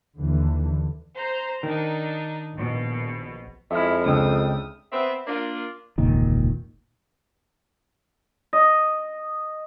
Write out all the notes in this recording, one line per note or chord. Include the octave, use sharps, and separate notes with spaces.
D#2 D3 E3
C5 A#5 C6
D#3 D4 D#4
A#1 B2
F2 G#3 E4 E5 F6
C#2 D4 G5 D#6 E6
B3 C4 E5
A#3 D4 F4
E1 C#2 A#2 D#3
D#5